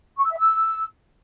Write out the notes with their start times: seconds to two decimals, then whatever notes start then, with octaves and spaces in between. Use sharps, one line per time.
0.17 C#6
0.24 E6
0.31 E5
0.38 E6